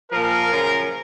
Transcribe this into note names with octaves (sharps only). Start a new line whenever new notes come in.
A#2 F3 A#4
F#2 C#3 F3